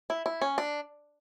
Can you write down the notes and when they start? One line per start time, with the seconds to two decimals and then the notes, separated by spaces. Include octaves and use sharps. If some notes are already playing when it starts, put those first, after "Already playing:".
0.10 E4
0.26 E4
0.41 C#4
0.58 D4